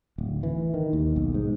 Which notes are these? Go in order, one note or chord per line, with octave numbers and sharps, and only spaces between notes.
D1
E3
D#3
D#2
B1
G#2